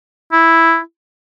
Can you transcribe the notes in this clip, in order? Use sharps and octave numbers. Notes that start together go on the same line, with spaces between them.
E4